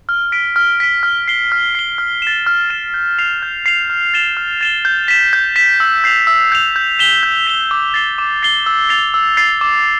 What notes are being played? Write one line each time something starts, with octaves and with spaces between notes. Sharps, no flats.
F6
B6 D7
F6
B6 D7
F6
C7 G7
F6
C7 G7
F6
A6 E7
F6
A6 E7
G6
C7 F7
G6
C7 F7
F6
A6 E7 G7
F6
A6 E7 G7
G6
B6 E7
G6
B6 E7
E6
G6 C7 F7
E6
G6 C7 F7
G6
B6 E7 G7
G6
B6 E7 G7
D6
A6 C7 G7
D6
A6 C7 G7
E6
A6 C7 F7
E6
A6 C7 F7
D6